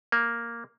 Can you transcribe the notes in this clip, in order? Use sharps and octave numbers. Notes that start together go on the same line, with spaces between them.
A#3